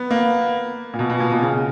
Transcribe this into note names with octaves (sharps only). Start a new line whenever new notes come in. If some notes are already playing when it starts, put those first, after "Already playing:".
Already playing: B3
A#3
A#2
B2
B2
A#2
B2
C#3